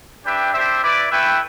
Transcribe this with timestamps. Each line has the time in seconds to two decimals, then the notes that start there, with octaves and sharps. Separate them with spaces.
0.25 D4 G4 B4 E5 G5
0.53 D4 G4 C5 E5
0.82 E4 B4 D5
1.10 A3 E4 B4 E5 G5